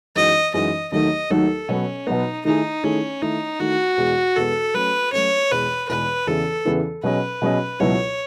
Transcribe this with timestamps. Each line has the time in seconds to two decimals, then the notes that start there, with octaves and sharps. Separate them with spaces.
0.15 F#2 E3 G#3 D#4 F#4 D#5
0.54 F#2 E3 G#3 D#4 F#4 D#5
0.92 D#2 D#3 F#3 A3 D#4 D#5
1.30 D#2 D#3 F#3 A3 D#4 A4
1.69 B2 F#3 B3 C#4
2.07 B2 F#3 B3 D#4
2.45 D#3 A3 D#4 E4 G#4
2.83 D#3 A3 C#4 E4 G#4
3.22 D#3 A3 D#4 E4
3.60 D#3 A3 E4 F#4
3.97 E2 B2 G#3 B3
4.36 E2 B2 G#3 B3 A4
4.74 F#3 A3 C#4 B4
5.12 F#3 A3 C#4 C#5
5.51 E2 B2 G#3 B4
5.89 E2 B2 G#3 B4
6.27 E2 C#3 E3 B3 E4 A4
6.65 E2 C#3 E3 B3 E4
7.03 B2 F#3 C#4 G#4 B4 D#5
7.42 B2 F#3 C#4 G#4 D#5
7.79 C#2 B2 F#3 B3 E4 C#5